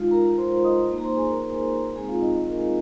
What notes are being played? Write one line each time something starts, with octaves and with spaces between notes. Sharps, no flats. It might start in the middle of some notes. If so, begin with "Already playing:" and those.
Already playing: G#3 D#4 F4 F5
A#4 A#5
C5 C6
D#5 D#6
A#3 D#4
A#5
C5 C6
G#4 G#5
A#4 A#5
A#5
G#3 C4 D#4 G#4 G#5
F4 F5
D#4 D#5
D#4 D#5
A#4